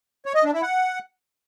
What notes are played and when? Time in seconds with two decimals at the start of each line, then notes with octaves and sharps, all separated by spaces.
0.26 C#5
0.35 D#5
0.44 D4
0.53 E4
0.62 F#5